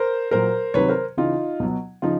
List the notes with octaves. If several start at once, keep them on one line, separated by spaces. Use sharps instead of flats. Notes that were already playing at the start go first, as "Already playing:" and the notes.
Already playing: A#4 C5
A#2 F#3 A#4 C5
C3 D#3 F#3 B4 C#5
A#4 C5
C#3 E3 D#4 F4
B2 F#3
C#3 F3 D#4 F4